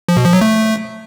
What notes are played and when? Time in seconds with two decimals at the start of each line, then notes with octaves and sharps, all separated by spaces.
0.09 F3
0.17 B2
0.25 F3
0.33 F#3
0.41 A3